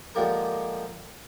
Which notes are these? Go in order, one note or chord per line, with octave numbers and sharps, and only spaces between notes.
D3 F3 G#3 A#3 G4 A#4